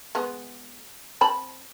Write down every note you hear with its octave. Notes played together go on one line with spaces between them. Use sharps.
G#3 B3
C4 A5 B5